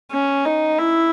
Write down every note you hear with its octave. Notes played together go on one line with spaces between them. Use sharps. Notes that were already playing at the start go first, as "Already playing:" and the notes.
C#4
D#4
E4